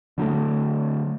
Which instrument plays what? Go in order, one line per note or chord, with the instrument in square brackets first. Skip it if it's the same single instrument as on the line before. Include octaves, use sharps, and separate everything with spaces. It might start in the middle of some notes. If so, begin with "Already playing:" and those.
[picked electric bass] D3 F#3 G3 A3